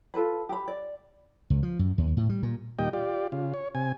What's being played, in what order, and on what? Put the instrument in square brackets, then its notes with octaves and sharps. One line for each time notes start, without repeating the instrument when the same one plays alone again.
[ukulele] F4 A4 B4 B5
G4 B5
D5
[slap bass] C#2
F3
F#2
D#2
A2
G3
A#2
[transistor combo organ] D#2 A#2 G3 D#5 G5
F4 G4 D5
C#3 F4
C#5
C3 G#5